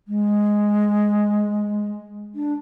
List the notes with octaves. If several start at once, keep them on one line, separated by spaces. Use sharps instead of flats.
G#3
D4